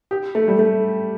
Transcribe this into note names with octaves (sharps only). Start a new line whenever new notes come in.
G4
A3
G3
A3